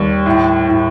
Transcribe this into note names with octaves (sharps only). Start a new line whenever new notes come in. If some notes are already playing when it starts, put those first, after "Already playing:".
Already playing: D#2 G3
A2
A2